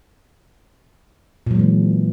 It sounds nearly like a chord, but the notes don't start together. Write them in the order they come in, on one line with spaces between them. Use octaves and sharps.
A#2 F#3 G#3 E3